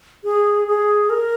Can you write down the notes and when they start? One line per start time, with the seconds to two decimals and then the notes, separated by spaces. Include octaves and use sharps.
0.24 G#4
0.68 G#4
1.10 A#4